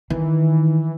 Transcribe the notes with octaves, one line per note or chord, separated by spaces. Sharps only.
D#3 E3